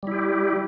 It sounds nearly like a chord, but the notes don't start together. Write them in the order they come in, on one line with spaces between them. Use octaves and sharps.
G3 E4 G4